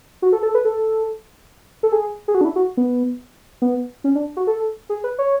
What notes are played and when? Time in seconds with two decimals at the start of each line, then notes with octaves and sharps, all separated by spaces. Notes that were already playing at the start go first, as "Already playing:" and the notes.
0.22 F#4
0.33 A4
0.43 A4
0.55 B4
0.65 A4
1.83 A4
1.92 G#4
2.28 G#4
2.35 F#4
2.41 D4
2.45 E4
2.56 F#4
2.77 B3
3.62 B3
4.04 C#4
4.15 D4
4.37 F#4
4.47 A4
4.90 G#4
5.04 B4
5.19 C#5